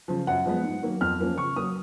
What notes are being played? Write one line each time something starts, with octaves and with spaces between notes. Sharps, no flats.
C#3 F3
F#2 F#5
F3 G#3 B3
G#2
D#3 F#3 A#3
F2 F6
F3 A#3 C#4
C#3 C#6
F#3 A#3 D#6